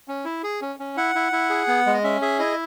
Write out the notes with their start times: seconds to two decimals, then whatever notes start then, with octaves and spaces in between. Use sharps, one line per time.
0.08 C#4
0.25 E4
0.43 G#4
0.62 C#4
0.80 C#4
0.97 E4 F#5
1.15 E4
1.32 E4
1.50 G#4
1.68 B3
1.86 G#3
1.94 D#5
2.04 C#4 E5
2.22 G#4 E5
2.39 E4 D#5